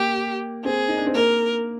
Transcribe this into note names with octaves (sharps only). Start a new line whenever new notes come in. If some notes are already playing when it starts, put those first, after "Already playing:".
Already playing: A#3 G4
C4 G#4
D#4
D4
C4
A#3 A#4